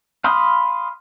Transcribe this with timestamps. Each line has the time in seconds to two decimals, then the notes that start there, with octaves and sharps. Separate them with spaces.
0.24 F5 B5 C6 D#6 F6